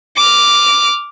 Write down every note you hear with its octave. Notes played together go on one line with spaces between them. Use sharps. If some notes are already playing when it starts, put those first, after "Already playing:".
D6 F6